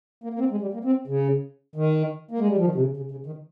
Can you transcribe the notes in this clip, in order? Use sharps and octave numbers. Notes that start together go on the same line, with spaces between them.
A#3
A#3
C4
G#3
G3
A#3
C4
C#3
D#3
A#3
G#3
G3
F3
D#3
C3
C#3
C#3
C#3
D#3